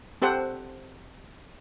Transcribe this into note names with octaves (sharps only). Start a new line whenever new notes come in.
C4 G4 A4 C5 F#5